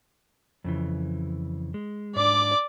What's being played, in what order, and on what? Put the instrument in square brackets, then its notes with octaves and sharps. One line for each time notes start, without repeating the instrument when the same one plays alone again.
[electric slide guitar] F2 C#3 E3
G#3
[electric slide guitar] G#2 D4 [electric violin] D5 D6